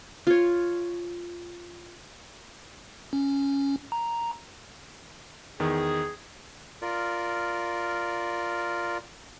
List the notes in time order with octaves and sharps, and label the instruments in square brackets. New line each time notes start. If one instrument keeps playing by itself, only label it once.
[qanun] F4 C#5
[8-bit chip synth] C#4
A#5
[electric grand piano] E2 D#3 [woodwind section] G#4
[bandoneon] F4 A#4 D5